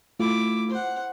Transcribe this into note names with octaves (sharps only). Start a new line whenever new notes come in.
A3 E4 F4 D6
C5 F#5